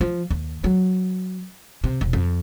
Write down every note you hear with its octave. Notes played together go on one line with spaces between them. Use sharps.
F3
D#2
F#3
C3
E1
F2